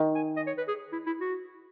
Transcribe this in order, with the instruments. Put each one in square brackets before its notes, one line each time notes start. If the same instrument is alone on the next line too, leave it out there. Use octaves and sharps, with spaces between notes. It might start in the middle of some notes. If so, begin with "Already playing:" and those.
Already playing: [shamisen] D#3
[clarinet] G#5
D#5
C#5
B4
G#4
E4
E4
F#4